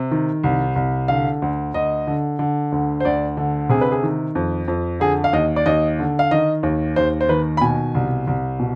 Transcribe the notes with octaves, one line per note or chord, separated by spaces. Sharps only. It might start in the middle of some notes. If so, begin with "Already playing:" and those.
Already playing: C3
D#3
C2
C2
D3 F5
D2
D2 D#5
D3
D3
D2
C5
D2 D5
D3
C3 G#4
B4
G#4
D#3
F2
F2
D3 G#4
F5
D#2 D#5
D5
D#2 D#5
D3
F5
D#3 D#5
D#2
D#2 C5
C5
D#3 B4
B5
B2 G#5
C2
C2
B2